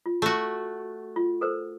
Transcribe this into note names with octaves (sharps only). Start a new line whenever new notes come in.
F4
A3 F#4
F4
A4 A#4 C5